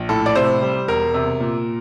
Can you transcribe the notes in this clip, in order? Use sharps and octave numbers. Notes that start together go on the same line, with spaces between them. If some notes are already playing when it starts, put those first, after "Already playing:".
Already playing: A#1
A2 A4
D5
C3 C5
G3
E1 A#4
C3
A#2